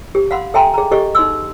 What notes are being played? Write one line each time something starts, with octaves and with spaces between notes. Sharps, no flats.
G4
F5 F#5 B5 C6
A4 E5 G5 G#5 A#5 C6
G#4 A#5
G4 A4 D#5 C#6
D#4 C6 E6